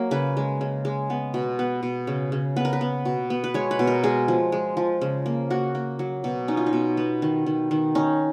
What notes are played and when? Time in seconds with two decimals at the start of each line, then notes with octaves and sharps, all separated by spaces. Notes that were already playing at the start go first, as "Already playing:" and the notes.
Already playing: F#3 A#3
0.11 C#3 B4
0.37 G#3
0.61 C#3
0.85 G#3
1.10 B3
1.34 B2
1.59 B3 B4
1.83 B2
2.07 C#3
2.32 C#3
2.56 B3 B4
2.65 A#4
2.73 B4
2.81 B3
3.05 B2
3.30 B3
3.44 B4
3.54 G#3 C#5
3.71 B4
3.79 B2
3.87 A#4
4.03 G#3 G#4
4.28 F3
4.52 G#3
4.77 F3
5.01 C#3
5.26 A#3
5.50 A#3 F#4
5.75 A#3
5.99 F#3
6.24 B2
6.48 C#4 D#4
6.57 F4
6.66 D#4
6.73 B2
6.97 B3
7.22 D#3
7.46 D#3
7.71 D#3
7.95 C#4 D#4